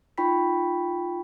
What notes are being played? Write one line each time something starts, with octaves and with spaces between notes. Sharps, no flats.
D#4 F4 G5 B5 C#6 B6